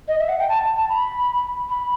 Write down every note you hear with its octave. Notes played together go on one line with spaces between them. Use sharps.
D#5
E5
F#5
G5
A5
A5
B5
B5